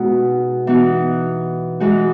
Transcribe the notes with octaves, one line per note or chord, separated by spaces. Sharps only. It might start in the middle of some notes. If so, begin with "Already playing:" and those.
Already playing: B2 G#3 B3 D#4 F#4
E3 B3 D#4 F#4
E3 G#3 D#4 F#4